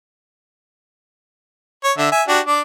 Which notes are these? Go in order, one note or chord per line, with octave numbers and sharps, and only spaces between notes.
C#5
D3 E5
E5 G#5
D4 F#4 G4
D4 D6